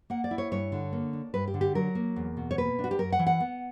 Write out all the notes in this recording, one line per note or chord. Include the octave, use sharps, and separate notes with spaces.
A#3 F#5
D5
E4
C#5
G2 C#5
D3
A#3
D4
G2 B4
G4
D3
G4
F#3 A#4
A#3
E2
B2
C#5
A#3 B4
D4
F#4
G4
F#2 A#4
F#5
E3
F#5
B3